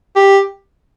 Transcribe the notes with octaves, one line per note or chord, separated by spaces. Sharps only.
G4